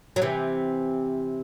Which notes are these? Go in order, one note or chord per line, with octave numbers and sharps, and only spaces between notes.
F#3
C3 E3